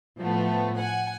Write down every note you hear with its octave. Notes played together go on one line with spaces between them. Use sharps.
A2 F3 A3 B3
F#5 G#5